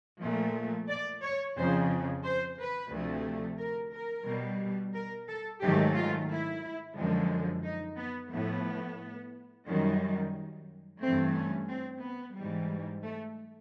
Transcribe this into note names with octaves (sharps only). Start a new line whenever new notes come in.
A#2 F3 A3
D5
C#5
F2 C#3 F3 C5
C5
B4
D2 C3 F3 A3
A#4
A#4
B2 G3
A#4
A4
G#2 D#3 F#3 A3 G4
F4
E4
F#2 D3 F3 G#3
D#4
B3
A2 F3 A3 B3
F#2 D#3 G3
G2 E3 A3 C4
C#4
C4
B3
G#2 E3 G3
A3